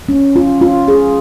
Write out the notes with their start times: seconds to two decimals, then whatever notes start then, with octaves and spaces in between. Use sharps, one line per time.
0.09 C#4
0.36 F4
0.62 F4
0.88 G#4